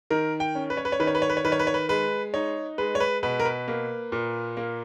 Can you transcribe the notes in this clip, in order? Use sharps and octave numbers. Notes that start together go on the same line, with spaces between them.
D#3 A#4
G5
C#4
B4
C#5
B4
C#5
D#3 B4
C#5
B4
C#5
B4
C#5
D#3 B4
C#5
B4
C#5
B4
G#3 B4
D#4 C#5
G#3 B4
C#5
B4
B2 B4
A#4
B4
A#3
A#2
A#3